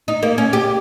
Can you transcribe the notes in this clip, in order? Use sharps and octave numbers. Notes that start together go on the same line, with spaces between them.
D#4
A#3
C#4
G4